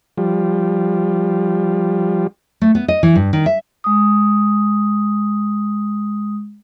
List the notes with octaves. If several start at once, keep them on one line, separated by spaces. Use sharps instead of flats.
F3 G3
A3
B3
D#5
E3
G2
D#3
E5
G#3 D#6